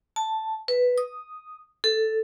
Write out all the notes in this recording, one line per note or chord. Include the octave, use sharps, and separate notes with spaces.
A5
B4
D#6
A4